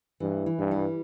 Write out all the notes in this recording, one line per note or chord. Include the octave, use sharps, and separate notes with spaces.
G2 E3
E3
G2
G3